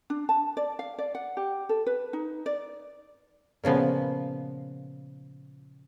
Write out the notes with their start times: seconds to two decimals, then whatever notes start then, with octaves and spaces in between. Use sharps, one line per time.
0.10 D4
0.29 A5
0.57 D5
0.79 F5
0.98 D5
1.15 F#5
1.37 G4
1.69 A4
1.87 B4
2.13 D#4
2.46 D5
3.64 A#2 C#3 F3 B3